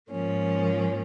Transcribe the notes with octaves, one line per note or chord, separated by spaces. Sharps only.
G#2 F3 A#3 C#4